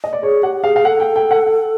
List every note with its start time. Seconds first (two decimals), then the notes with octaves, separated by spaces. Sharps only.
0.04 D#5
0.13 D5
0.23 G#4 C#5
0.43 G4 F#5
0.64 G#4 F5
0.76 F5
0.85 A4 F#5
1.00 G5
1.16 G5
1.31 F#5
1.46 F#5